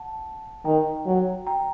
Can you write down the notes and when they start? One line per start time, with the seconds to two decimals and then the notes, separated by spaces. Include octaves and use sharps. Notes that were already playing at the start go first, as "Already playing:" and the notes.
Already playing: F#5 A5
0.65 D#3 G5 A#5
1.06 F#3
1.47 G5 A#5